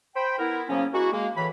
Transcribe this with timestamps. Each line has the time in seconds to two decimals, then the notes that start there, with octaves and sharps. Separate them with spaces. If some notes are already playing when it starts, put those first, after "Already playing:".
0.16 C5 G5 B5
0.39 B3 E4 A#4
0.69 C#3 F3 F#3 A#3 B3 C#4
0.94 G#3 A#3 E4 F#4
1.13 G#3 A#3
1.37 A2 E3 B5